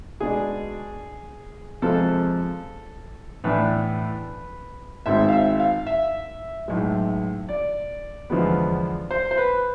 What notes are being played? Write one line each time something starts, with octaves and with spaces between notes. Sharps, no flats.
B2 G#3 D4 G#4
F2 C3 F3 G#3 A4
A2 E3 B3 D4 B4
G#1 G#2 G#3 C4 E5
F5
E5
F5
E5
B1 A2 G#3
D5
E2 D3 F3 G#3 B3
C5
C5
B4